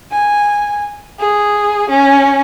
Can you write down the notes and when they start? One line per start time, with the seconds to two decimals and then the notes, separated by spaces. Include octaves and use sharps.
0.11 G#5
1.19 G#4
1.89 C#4